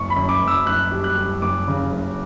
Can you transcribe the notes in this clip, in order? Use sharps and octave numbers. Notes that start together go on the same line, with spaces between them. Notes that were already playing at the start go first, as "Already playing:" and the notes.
Already playing: F#1 C#6
B5
F#2
D6
F#1
E6
F#1 F#6
G3
F#6
G3
F#1 D6
C#3
F#1